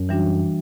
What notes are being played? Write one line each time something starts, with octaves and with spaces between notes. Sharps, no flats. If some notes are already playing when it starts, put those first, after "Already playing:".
Already playing: F#2
E3 G3 D4 F#4